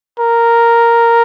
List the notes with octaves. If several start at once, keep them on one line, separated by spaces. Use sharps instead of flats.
A#4